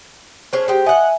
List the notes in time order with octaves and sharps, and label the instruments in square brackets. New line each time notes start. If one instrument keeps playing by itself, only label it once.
[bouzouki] A3 C#4 G#4 [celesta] C5
[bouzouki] G#3 G4
[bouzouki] D#5 F#5 [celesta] E5 G#5